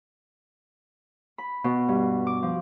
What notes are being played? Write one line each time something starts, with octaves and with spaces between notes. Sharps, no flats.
B5
B2
G2
D6
F3